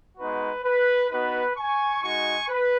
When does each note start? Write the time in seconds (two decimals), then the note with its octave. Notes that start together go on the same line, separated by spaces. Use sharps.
0.18 G#3 B3 D#4 F#4 B4
0.64 B4
1.11 B3 D#4 F#4 B4
1.57 G#5 C#6
2.03 G#3 D#4 F#4 G#5 C#6
2.49 B4